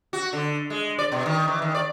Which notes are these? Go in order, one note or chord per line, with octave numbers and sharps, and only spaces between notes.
F#4
D3
G#3
D5
B2
D#3
E3
D#3
D5